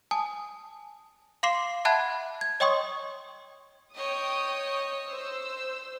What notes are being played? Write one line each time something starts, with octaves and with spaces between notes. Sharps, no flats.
G#5 A5 D#6
F5 C6 D6 C7 E7
E5 F#5 A5 B5 F#6 G#6
G#6
C#5 D#5 G5 C6 C#6 D#6
C#5 D#5 G5 D#6
C5 E6